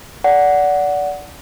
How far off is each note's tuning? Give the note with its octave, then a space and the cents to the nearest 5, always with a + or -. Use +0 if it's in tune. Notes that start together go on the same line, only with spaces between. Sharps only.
D5 -20 F#5 +0